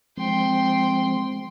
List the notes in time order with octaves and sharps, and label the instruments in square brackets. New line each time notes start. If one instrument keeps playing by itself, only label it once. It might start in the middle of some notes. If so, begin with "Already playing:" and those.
[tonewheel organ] F3 G#3 C4 [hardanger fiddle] G5 C6